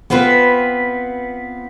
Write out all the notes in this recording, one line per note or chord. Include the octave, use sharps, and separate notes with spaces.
B3 C4 F4 B4